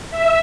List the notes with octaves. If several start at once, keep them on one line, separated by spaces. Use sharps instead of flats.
E5